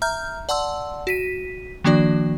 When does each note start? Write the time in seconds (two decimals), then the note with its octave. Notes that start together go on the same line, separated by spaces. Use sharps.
0.02 E5 A#5 F6 G6
0.49 D5 F#5 A5 C6 E6
1.07 F#4 B6 D#7
1.84 D#3 F3 A#3 D4 F#4 D5